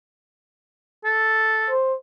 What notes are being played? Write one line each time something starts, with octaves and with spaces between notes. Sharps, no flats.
A4
C5